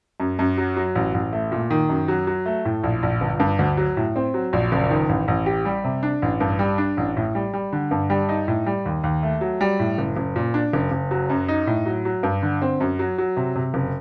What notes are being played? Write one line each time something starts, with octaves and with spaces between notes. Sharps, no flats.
F#2
F#2
F#3
F#3
A1
A1
A3
A#2
D#3
F#2
F#3
F#3
A3
A2
A#1
A#1
G1
G2
D2
F#3
A2
C4
F#3
A#1
F#1
D#3
A1
A1
G4
G3
C3
D4
A1
G2
G3
D4
A1
A2
G3
G3
D3
G2
G3
D#4
A2
G3
D#2
D#2
A3
F#3
G3
A2
F#1
F#1
A#2
D4
F#1
F#1
F#3
F#2
D#4
A2
F#3
F#3
G2
D3
C4
F#2
F#3
F#3
C3
C3
F#1